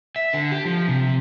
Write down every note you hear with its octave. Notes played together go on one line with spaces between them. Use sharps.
E5
D3
G4
F3
C3